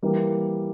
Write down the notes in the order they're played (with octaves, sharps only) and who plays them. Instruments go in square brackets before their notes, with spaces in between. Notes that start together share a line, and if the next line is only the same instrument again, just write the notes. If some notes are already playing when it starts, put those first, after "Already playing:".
[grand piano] E3 G3 A#3